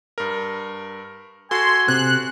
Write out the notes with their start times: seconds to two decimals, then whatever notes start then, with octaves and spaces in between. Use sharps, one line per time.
0.18 G2 A#4
1.51 F#4 A4 G#5 C6
1.88 C3 F#6